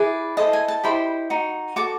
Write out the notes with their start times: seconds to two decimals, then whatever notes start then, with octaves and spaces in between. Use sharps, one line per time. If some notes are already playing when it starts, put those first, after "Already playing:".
Already playing: E4 G#4 B4 D5
0.37 E4 A4 C5 D#5 A5
0.53 G#5
0.68 A5
0.83 E4 G4 C5 D#5 B5
1.30 D#4 F#4
1.76 F#4 A4 D6